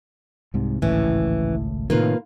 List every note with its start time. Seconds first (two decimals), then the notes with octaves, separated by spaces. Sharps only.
0.54 C2 G#2 C3
0.82 G#1 C#2 A2 E3 C#4
1.90 A2 C3 D#3 A#3 F4 B4